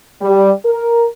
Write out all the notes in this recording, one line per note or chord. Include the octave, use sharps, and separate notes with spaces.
G3
A#4